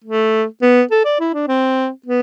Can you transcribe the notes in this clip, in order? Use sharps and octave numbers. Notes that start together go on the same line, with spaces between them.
A3
B3
A4
D5
E4
D4
C4
B3